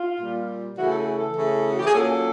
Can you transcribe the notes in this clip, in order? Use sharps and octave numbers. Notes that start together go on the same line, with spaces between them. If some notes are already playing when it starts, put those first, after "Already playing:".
Already playing: F4
A#2 G3 A#3
C#3 E3 A3 F#4
A4
G#4
A4
C#3 E3 A3
F#4
G4
G#4
A#2 F#3 A#3 C#4 A4